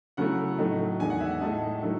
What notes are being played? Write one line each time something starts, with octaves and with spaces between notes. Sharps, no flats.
C#3 F#3 A3 E4 F#5
A2 F#3 A3 D#4
E2 D#3 G#3 G#5
F#5
E5
F#5
A2 G#3 D#4 A5
D#3 F#3 A3 E4